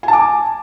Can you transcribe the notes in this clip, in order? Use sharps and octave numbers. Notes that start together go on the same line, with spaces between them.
G#5 A5 D6